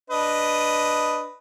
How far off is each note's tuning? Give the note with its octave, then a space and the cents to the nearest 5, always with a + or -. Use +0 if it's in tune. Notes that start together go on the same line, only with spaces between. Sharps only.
D4 +0 B4 +0 D#5 +0